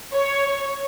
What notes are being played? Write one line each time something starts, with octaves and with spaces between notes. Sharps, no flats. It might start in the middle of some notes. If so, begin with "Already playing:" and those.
C#5